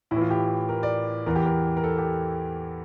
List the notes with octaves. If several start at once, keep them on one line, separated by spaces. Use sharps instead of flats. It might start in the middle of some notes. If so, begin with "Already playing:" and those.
A2 E4
E3
F4
G4
A#4
D5
E2 E3 A#4
G4
A#4
A#4
A4
G4